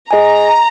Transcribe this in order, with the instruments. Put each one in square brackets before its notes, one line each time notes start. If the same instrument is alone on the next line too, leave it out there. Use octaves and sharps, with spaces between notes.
[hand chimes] G#4 D#5 G#5 [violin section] A#5